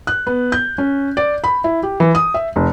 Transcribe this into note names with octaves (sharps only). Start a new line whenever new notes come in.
F#6
B3
G6
C#4
D5
B5
E4
G4
E3
D#6
E5
F1